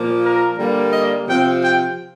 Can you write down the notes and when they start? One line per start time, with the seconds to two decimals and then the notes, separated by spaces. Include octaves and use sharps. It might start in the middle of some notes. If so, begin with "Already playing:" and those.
Already playing: A#2 F3 A#3
0.24 A#4
0.59 D3 G3 A#3
0.93 D#5
1.27 C3 F3 C4 G5
1.62 G5